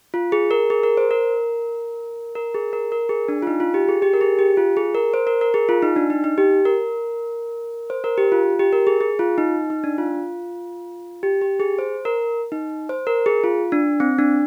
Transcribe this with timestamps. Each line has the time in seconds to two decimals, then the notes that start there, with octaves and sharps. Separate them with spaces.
0.14 F4
0.32 G#4
0.51 A#4
0.70 G#4
0.83 A#4
0.97 C5
1.11 A#4
2.35 A#4
2.54 G#4
2.73 A#4
2.92 A#4
3.09 G#4
3.28 D4
3.43 F4
3.47 D#4
3.60 F4
3.74 G4
3.88 G#4
4.02 G4
4.13 A#4
4.21 G#4
4.39 G4
4.57 F4
4.77 G#4
4.95 A#4
5.14 C5
5.27 A#4
5.41 A#4
5.54 G#4
5.69 F4
5.82 D#4
5.96 D4
6.10 D#4
6.24 D#4
6.38 G4
6.65 A#4
7.90 C5
8.04 A#4
8.18 G4
8.32 F4
8.59 G4
8.73 A#4
8.87 G#4
9.01 G#4
9.19 F4
9.38 D#4
9.70 D#4
9.84 D4
9.98 F4
11.23 G4
11.41 G4
11.60 G#4
11.79 C5
12.05 A#4
12.52 D#4
12.89 C5
13.07 A#4
13.26 G#4
13.44 F4
13.72 D4
14.00 C4
14.18 D4